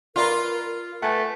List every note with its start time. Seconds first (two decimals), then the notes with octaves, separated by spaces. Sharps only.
0.16 F4 A#4 B4 D5 A#5
1.02 A3 B4 F#5 G#5